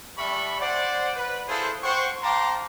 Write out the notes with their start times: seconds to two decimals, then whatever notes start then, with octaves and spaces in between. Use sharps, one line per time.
0.18 G3 D4 E5 B5 C#6
0.60 C5 D5 F#5
1.16 B4
1.48 E4 F4 G#4 A4 C5
1.83 C5 F#5 G5 C#6
2.22 F5 G5 A5 A#5 C6 D6